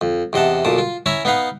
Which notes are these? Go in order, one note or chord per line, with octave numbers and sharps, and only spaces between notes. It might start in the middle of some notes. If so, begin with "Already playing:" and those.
F2
E2 C3 D#5 F#5 A5
B1 A#2 A5 D#6
F4
C#4 E4 E5 G#5 A#5
B3 D#4 B4 F5 F#5